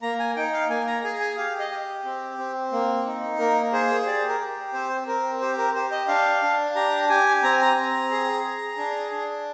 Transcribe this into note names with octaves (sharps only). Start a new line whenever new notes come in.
A#3 A#5
G#5
D#4 G5
F5
A#3 G#5
A#5
G#4 G#5
G#5
G4 F5
D#5
G4
C4
C4
A#3
D#4
A#3 A#4
G#4 C5
G4 D5
A#4
G4
C4 C5
C4 A#4
G4 C5
A#4
G4 C5
D#5
D4 F5
D4
G4 A#5
G4 G#5
C4 A#5
G#5
A#5
C4
G#4
G#4
D4
D4